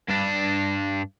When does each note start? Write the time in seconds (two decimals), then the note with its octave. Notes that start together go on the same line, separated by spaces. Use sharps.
0.08 G2 D4